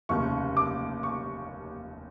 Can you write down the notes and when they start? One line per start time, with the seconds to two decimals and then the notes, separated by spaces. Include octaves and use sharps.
0.09 F1 D#2 C#3 C#6
0.57 D6
1.03 C#6